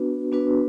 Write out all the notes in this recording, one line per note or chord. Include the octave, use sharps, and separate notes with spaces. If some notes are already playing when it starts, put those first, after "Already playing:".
Already playing: B3 D4 F#4 B4
B3 D4 F#4 B4